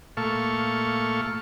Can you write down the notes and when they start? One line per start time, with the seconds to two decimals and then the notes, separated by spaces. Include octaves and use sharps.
0.17 A#2 A3 A4 F5 C#6